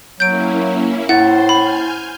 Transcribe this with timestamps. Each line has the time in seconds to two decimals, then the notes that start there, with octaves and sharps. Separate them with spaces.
0.20 F#3 A#3 C#4 E4 G6 D7
1.09 A2 E4 C5 F#5 C6 A6
1.49 G#5 B5 F6 G6